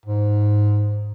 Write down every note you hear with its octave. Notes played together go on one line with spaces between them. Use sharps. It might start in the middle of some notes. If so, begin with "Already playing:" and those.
G#2